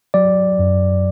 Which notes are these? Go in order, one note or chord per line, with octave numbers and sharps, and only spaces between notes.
F#3 D5
F#2